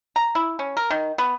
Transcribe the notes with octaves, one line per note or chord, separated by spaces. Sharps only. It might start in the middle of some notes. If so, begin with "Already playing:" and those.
A#5
E4
C#4
A#4
D#3
B3